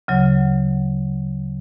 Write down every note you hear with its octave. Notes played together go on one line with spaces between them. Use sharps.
D2 C#3 F#3